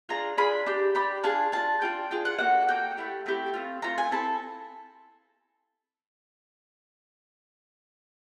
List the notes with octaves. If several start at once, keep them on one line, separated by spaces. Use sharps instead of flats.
D4 F4 G#4 A#5
D4 F4 G#4 B5
D4 G4
D4 G4 B5
D4 F4 G#4 A5
D4 F4 G#4 A5
D4 F4 G#4 G5
D4 F4 G#4 G5
F#5
A#3 D4 F#4 A4 F#5
A#3 D4 F#4 A4 G5
A3 C4 E4 G4
A3 C4 E4 G4
A3 C4 F4
A3 C4 F4 A#5
G#5
C4 E4 A4 A5